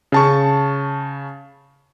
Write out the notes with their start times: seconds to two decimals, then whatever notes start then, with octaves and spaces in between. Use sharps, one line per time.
0.12 C#3 A5 C#6